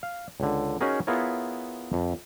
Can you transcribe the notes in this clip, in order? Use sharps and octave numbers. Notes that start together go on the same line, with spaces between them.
F5
C#2 D3
C#4 D#4 F#4 G#4 A#4
B3 E4 F4 G#4 A#4 C#5
F2